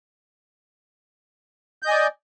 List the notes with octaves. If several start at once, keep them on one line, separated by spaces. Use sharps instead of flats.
D5 D#5 G#5 G6